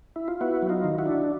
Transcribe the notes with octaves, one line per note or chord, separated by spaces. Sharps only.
E4
F4
B3 E4 F#4
F#3
D#4 F4
D#3
E4 F#4
D4